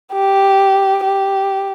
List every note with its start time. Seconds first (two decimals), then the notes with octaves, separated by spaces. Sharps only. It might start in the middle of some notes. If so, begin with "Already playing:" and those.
0.13 G4
1.05 G4